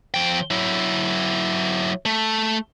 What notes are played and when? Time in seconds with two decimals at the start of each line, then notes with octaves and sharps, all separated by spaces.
0.14 F3 G5
0.51 F#3 E4
2.05 A3